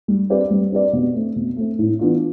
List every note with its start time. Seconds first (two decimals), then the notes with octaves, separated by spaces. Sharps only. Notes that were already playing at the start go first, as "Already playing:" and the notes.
0.08 G3
0.30 C4 G4 B4 D5
0.50 G3
0.72 C4 G4 B4 D5
0.93 B2
1.14 A3 C4
1.36 B2
1.56 A3 C4
1.79 A2
1.99 E3 B3 D4 F4